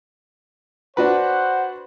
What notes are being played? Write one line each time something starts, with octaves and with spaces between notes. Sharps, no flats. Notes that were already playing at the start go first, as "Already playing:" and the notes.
D4 F#4 B4 C5 F#5